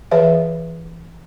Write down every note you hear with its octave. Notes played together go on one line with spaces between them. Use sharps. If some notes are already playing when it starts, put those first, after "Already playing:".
E3 G#4 B4 C#5 E5 F5